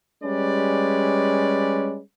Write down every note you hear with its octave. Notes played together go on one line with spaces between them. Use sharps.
G3 G#3 C#4 G4 B4 D5